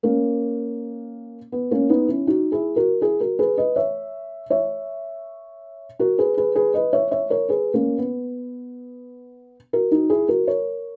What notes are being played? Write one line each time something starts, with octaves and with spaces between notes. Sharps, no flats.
A#3 C#4
B3
A#3 C#4
B3 D#4
C#4 E4
D#4 F#4
E4 G#4
F#4 A#4
E4 G#4
F#4 A#4
G#4 B4
B4 D#5
C#5 E5
C#5 E5
F#4 A#4
G#4 B4
G#4 B4
G#4 B4
B4 D#5
C#5 E5
C#5 E5
A#4 C#5
G#4 B4
A#3 C#4
B3
F#4 A#4
D#4 F#4
E4 G#4
F#4 A#4
A#4 C#5